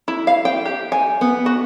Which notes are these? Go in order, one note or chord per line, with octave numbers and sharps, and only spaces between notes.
E4
F5
G5
G4
G#5
B3
F#4